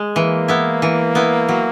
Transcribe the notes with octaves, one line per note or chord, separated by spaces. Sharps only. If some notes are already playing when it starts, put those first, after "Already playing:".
Already playing: G#3
E3 A#3
B3 E4
E3
B3 E4
F#3